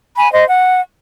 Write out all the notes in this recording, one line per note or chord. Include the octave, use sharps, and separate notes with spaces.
G#5 B5
C5 D#5
F#5